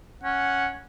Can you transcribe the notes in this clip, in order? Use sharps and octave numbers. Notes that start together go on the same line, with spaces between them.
C#4 F#5